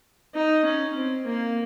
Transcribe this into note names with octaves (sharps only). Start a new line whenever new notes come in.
D#4
C#4
C4
A#3